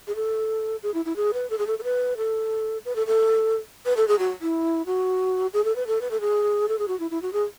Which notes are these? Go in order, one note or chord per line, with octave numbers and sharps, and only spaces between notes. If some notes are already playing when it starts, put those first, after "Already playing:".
G#4
A4
G#4
E4
E4
G#4
B4
A4
G#4
A4
A4
B4
A4
B4
A4
A4
B4
A4
G#4
F#4
E4
F#4
G#4
A4
B4
A4
B4
A4
G#4
A4
G#4
F#4
E4
E4
F#4
G#4